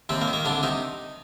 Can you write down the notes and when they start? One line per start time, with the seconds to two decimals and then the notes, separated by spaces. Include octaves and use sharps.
0.09 D#2 C3 C4
0.21 A#3
0.28 D#3
0.33 A#3
0.45 C2 D3 D4
0.63 C3 D#3 D#4